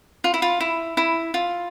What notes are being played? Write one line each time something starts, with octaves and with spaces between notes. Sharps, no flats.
F4
E4
F4
E4
E4
F4